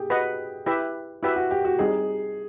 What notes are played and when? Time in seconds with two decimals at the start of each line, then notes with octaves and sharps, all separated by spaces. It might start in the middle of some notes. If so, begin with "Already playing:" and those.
Already playing: G4 G#4
0.10 F#4 B4 D#5 F#5
0.66 E4 G4 B4 E5
1.23 E4 F#4 G4 B4 E5
1.36 F#4
1.51 G4
1.65 F#4
1.79 G3 C4 D#4 G#4